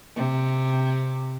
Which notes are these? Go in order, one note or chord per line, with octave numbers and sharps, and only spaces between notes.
C3